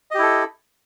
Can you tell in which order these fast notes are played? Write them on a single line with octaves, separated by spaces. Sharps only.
D#5 G4 E4 A4